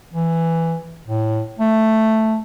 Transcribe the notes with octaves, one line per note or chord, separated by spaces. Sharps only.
E3
A2
A3